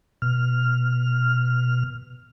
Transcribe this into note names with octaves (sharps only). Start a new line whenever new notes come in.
B2 F6